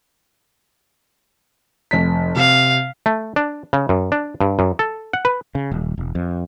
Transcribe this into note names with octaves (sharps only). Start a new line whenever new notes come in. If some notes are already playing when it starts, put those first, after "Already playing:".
F1 B6
C3 F5
A3
D4
C#3
F#2
D4
G2
F#2
A4
F#5
B4
C#3
D#1
E1
F2